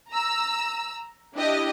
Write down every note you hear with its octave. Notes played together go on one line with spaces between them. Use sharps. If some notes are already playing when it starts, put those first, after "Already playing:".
A#5 E6
D4 E4 G4 D#5